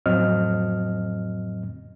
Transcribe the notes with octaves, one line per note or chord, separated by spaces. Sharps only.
F2 A2 F#3 C4 D#5 F6